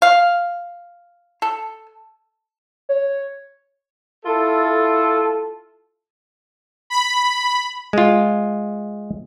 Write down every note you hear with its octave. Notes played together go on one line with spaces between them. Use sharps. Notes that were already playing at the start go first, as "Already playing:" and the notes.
F5
A4
C#5
E4 F4 A4
B5
G#3 F4